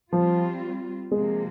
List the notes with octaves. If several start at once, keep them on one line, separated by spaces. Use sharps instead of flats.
F3 G3 C4 F4
C3 F3 G#3 A#3